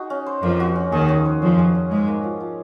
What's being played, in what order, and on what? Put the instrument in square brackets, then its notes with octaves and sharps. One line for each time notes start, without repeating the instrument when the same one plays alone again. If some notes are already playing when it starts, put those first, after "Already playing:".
Already playing: [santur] D#4 F#4 G#4
C#4
C5
[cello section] F2 F3 [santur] A#3
[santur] F#4
C#4
[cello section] D#2 D#3 [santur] G#4
[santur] C#4
C5
[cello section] F2 F3 [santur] F#3
[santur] G#4
C#4
[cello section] G#2 G#3 [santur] D#4
[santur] A#3
F3
F3